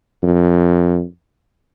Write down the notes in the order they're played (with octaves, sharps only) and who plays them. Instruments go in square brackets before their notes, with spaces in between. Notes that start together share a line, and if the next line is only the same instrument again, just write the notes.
[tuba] F2